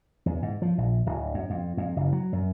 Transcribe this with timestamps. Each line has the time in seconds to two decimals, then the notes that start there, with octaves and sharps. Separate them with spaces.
0.26 E2
0.42 G#2
0.62 F3
0.78 A#1
1.06 D1
1.34 F#2
1.50 F2
1.77 F2
1.96 F#1
2.13 F#3
2.33 F#2